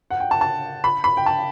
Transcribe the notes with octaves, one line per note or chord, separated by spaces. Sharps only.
F#5
G5
A5
A5
B5
B5
G5
A5